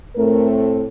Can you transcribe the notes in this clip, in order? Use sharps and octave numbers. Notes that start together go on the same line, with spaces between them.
A2 A3 C4 A#4